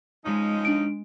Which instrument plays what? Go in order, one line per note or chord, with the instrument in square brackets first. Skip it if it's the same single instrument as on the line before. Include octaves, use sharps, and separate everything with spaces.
[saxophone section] F3 C#4 D#4 [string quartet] G#3
[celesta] D4 D7